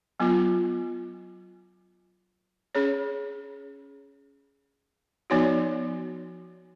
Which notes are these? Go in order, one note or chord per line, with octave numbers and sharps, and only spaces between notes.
F#3 B3 F4
C#4 G#4 C#5
F3 B3 D#4 F#4 C#5